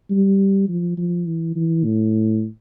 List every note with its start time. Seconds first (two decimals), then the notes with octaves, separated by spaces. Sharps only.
0.10 G3
0.69 F3
0.97 F3
1.26 E3
1.56 E3
1.85 A2